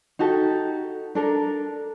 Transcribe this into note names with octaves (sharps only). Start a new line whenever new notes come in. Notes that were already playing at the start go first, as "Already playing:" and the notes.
D#4 F#4 G4 A4
D4 A4 A#4